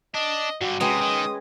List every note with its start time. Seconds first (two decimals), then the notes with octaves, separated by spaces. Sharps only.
0.14 D4 D#5
0.61 G2 D3 F#4
0.80 C3 G#3 C#4 B4 G5 D#6
1.01 D#3